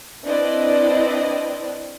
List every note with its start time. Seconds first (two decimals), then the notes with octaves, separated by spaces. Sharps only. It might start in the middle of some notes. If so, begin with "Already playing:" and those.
0.25 C4 D4 E4 B4 D5 D#5